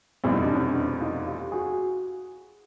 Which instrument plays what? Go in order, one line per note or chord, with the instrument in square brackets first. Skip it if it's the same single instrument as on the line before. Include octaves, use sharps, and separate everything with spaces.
[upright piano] F1 E2 B2 G3 C4 [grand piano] E4
[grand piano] D#4
D4
C#4 D#4
D#4 F4
F4 G4
F#4 G#4